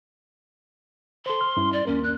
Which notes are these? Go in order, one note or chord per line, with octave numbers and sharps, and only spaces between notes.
A4 C5 C6
F6
G2 C#4 E4
D5
D#2 A#3 C#4 A#4
F#6